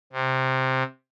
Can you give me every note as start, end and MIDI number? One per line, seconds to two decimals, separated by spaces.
0.13 0.83 48